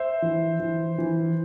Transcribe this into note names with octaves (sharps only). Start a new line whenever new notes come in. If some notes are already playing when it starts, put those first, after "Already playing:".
Already playing: C5 E5
E3
E3
E3